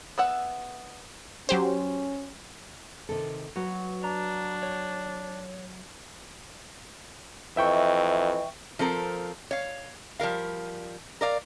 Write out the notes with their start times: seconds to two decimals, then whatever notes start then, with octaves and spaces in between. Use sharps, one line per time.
0.18 B3 E5 F#5
1.49 F#3 C#4 G4 C5
3.09 C3 D#3 A4
3.56 F#3 B4
4.04 D4 A#5
4.63 C#5
7.57 F2 E3 D#5 E5 G5 C#6
8.79 F3 C4 A4 A#4
9.51 C#5 F5
10.19 F3 G3 A#4 F5
11.21 A#4 D5 F5